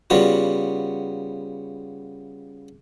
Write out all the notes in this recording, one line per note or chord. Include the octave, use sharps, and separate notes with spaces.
C#3 G3 B3 F4 F#4